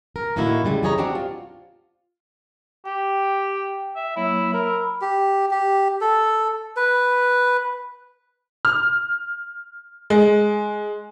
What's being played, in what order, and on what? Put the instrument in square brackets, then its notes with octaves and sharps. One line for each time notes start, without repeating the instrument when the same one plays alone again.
[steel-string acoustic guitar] A#4
A2 D3 A#3 D#4 E4 F#4
C#3 G3 G#3
F2 G3 G#4 C#5 D#5 A#5
C4 D4 F#4 G4
F4
[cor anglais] G4 [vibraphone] G5
[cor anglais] E5
[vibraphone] F#3 A#3 C#5 [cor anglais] E4
[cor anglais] A#4 [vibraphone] B5 E6
[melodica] G4
G4
A4
B4
[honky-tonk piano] F6
G#3